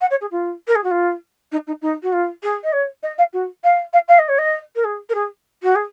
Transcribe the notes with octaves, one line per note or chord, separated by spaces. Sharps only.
F#5
C#5
G#4
F4
A#4
G#4
F#4
F4
D#4
D#4
D#4
F#4
F4
G#4
D#5
C#5
D#5
F5
F#4
F5
F5
F5
D#5
C#5
D#5
A#4
G#4
A#4
G#4
F#4
G#4